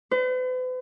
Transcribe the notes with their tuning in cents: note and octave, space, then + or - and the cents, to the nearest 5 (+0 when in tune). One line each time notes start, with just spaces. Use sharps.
B4 +45